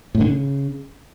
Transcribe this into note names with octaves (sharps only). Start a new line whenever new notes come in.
A2
D3
C#3